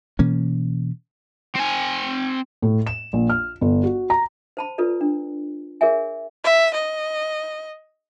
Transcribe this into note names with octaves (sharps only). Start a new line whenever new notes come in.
B2 E3 A#3 C#4
C4 G#5
A2
E7
A#1
F6
G1
F#4
A#5
C5 A5 B5
F4 A4 B4 D5
D4
G#4 A#4 C#5 E5 G#5
E5
D#5